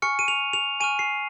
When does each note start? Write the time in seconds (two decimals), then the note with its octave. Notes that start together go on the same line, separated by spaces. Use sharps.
0.02 G#5 C#6 F6 C#7
0.19 D#7
0.28 F7
0.53 F7
0.80 G#5 C#6 F6 D#7
0.99 C7